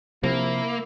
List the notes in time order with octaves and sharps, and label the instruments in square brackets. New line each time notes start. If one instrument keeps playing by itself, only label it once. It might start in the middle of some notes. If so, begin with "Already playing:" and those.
[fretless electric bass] C3 F3 [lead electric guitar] A#3 [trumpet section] E4